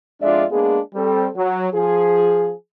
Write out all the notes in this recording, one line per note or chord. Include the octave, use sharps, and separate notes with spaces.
F2 G#3 D4 F4 D5 E5
G#3 A#3 B3 D4 G#4
G3 C4 A4
F#3
F3 G#4